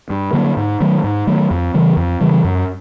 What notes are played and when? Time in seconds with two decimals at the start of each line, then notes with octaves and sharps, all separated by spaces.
0.10 G2
0.33 D3 F#3 A#3
0.57 G#2
0.80 D#3 F#3 A3
1.04 G#2
1.27 D#3 F#3 A3
1.51 F2
1.74 C#3 E3 G3
1.97 F2
2.21 C#3 E3 G3
2.44 F#2